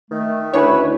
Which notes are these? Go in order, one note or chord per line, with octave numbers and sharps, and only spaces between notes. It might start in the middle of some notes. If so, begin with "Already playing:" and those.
D#3 A3
D2 C#4 D4 E4 B4 C#5